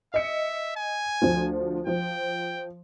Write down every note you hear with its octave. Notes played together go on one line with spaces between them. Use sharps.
D#5 E5 C#7
G#5
D2 F3
F3 G5